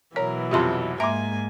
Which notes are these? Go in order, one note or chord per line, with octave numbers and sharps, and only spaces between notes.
B2 E3 F#3 A#4 C#5
F2 C3 G3 F4 G4 C6
G#2 A#3 E5 G#5 A#5 C6 D6